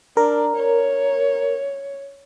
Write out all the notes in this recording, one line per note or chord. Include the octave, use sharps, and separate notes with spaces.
D4 A#4
C#5